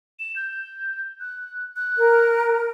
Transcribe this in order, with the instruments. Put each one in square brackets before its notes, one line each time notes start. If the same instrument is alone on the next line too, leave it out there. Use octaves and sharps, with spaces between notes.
[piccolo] E7
G6
F#6
F#6
[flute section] A#4